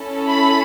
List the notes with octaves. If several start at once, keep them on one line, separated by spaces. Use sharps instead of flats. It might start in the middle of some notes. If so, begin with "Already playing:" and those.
Already playing: C#4 E4 A4
B5